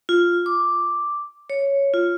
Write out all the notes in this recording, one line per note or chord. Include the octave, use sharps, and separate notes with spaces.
F4
D6
C#5
F4